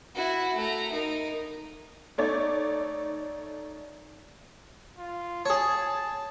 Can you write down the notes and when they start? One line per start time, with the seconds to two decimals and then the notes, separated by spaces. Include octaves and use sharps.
0.15 E4 F#4
0.56 A3 A#5
0.92 D#4 A#4
2.18 A3 D#4 C#5 D5
4.98 F4
5.46 G#4 C#5 A5